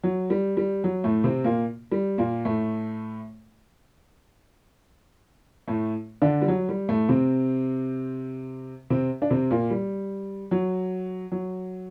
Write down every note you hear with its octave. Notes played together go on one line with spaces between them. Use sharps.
F#3
G3
G3
F#3
A2 A3
C3 C4
A#2 A#3
G3
A#2 A#3
A2 A3
A2 A3
D3 D4
G3
F#3
G3
A2 A3
C3 C4
C3 C4
D4
C3 C4
A#2 A#3
G3
F#3
F#3